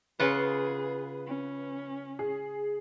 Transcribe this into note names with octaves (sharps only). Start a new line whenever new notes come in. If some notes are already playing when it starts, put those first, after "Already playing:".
C#3 F4 G#4 B4 F#5
C#4
G#4